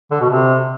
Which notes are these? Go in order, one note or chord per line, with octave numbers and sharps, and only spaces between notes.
D3
B2
C3